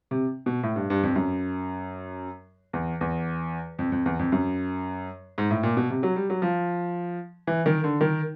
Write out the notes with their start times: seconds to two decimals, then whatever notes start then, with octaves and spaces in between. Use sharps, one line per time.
0.11 C3
0.46 B2
0.63 A2
0.76 G2
0.90 G2
1.03 F2
1.16 F#2
2.73 E2
3.01 E2
3.79 F2
3.92 F2
4.06 E2
4.19 F2
4.32 F#2
5.38 G#2
5.51 A2
5.63 A#2
5.77 B2
5.90 C3
6.03 F#3
6.16 G3
6.30 F#3
6.42 F3
7.47 E3
7.66 D#3
7.84 D3
8.01 D#3